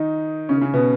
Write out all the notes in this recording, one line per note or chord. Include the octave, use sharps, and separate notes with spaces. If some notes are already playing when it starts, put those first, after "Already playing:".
Already playing: D#3 D#4
C#3 C#4
C#3 C#4
B2 B3